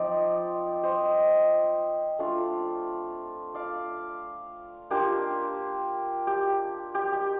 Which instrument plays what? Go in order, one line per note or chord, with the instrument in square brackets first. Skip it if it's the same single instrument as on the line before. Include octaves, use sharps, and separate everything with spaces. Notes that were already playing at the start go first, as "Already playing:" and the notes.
Already playing: [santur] F3 C4 D#4 D5
C5 D#5
A3 D4 F4
D5 F5
A#3 D4 F4 G4
G4
G4
G4